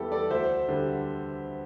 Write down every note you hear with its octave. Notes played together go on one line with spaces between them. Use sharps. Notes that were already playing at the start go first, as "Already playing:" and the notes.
Already playing: E2 E3 G3 G4 A4
A4 D5
D2 C5 E5
D3 G3